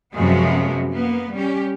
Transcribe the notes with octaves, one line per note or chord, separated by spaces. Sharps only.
F#2 C3 F3 G#3 B3 F#4
A#3 B3
G3 C#4 G4